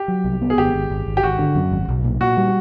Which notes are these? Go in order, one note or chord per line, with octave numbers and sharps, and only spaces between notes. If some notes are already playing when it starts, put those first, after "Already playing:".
Already playing: G4
F#3
C2
B3
G#4
G#1 G4
G#1
G#1
G#1
G4
G#1 F#4
D3
F#2
G#1
B1
A#2
A#2 F#4
G3